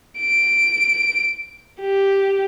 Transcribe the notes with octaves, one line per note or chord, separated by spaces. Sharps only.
D7
G4